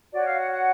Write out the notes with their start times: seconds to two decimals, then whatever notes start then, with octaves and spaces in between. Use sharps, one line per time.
0.12 F#4 C#5 D5
0.25 F5
0.37 F#5
0.51 F#5